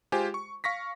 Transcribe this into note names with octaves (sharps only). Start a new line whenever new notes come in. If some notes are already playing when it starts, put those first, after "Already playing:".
G#3 F4 G4 C5 G#5
C#6
F5 C#6 A#6 B6